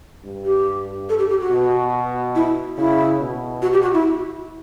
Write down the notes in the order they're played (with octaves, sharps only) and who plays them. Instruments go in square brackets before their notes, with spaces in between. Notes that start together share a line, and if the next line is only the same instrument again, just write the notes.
[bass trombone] G2
[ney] G4
A4
G4
G4
F#4
[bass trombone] B2
[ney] E4
[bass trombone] C#3 [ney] E4
[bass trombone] B2
[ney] F#4
G4
F#4
E4